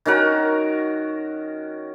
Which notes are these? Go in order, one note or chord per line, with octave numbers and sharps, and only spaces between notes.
D#3 C#4 F#4 A#4